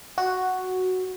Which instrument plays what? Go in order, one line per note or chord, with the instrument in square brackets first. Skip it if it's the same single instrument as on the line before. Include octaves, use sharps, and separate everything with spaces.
[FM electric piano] F#4